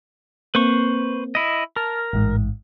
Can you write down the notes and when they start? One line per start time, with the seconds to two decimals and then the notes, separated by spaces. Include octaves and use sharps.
0.55 A#3 C4 B4 C5 C#6
1.35 E4 D#5
1.76 A#4 A5 F6
2.13 A1 G#2